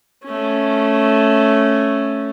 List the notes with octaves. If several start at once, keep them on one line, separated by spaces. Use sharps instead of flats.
A3 C#4